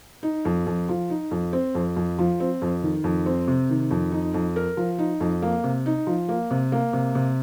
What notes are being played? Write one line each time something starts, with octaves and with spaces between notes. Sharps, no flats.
D#4
F2
F2
F3
D#4
F2
C4
F2
F2
F3
C4
F2
D#3
F2
C4
C3
D#3
F2
D#4
F2
A#4
F3
D#4
F2
A#3
C3
D#4
F3
A#3
C3
A#3
C3
C3